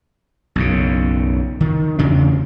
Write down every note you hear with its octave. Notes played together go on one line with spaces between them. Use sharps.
B1 F#2 C#3
D#3
E2 C#3 D4